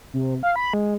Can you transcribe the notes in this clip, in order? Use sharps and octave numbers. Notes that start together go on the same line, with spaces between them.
C3
F5
B5
G#3